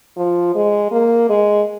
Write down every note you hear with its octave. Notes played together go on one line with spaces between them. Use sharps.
F3
G#3
A#3
G#3